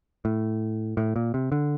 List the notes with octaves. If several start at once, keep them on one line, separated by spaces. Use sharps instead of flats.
A2
A2
A#2
C3
D3